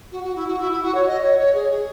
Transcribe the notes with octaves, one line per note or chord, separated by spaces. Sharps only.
F#4
F#4
E4
F#4
E4
E4
F#4
C#5
D#5
C#5
C#5
G#4
G#4